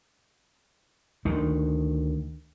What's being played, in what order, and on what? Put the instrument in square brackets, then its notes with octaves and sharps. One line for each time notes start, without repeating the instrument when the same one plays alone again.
[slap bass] D2 D#3